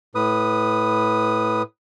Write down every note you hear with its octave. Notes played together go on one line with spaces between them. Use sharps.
A2 B4 D#6